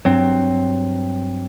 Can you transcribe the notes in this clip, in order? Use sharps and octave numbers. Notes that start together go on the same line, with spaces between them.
G2 F#3 C4